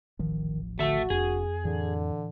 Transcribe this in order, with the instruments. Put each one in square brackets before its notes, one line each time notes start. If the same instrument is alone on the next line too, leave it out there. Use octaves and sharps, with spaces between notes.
[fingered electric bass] D#1 A1 F3 [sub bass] D#3
[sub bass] D3 [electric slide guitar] A3 E5 [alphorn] F#4
[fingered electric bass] F1 D4 [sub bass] F2 [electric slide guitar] G#4
[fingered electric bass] A2 E3 [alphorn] D3